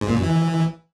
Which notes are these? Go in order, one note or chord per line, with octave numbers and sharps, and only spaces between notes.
G#2
A#2
F#2
E3